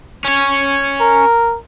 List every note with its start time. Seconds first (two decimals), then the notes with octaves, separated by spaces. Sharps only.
0.25 C#4 C#5
1.01 A#4